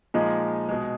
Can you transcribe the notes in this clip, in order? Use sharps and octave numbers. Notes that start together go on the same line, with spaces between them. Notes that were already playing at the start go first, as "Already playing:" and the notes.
A#2 F3 G#3 D#4 G#4
B2 G#3